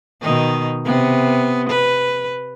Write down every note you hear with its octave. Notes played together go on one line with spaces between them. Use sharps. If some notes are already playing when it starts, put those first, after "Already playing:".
B2 D#3 D#4
C3 B3
B4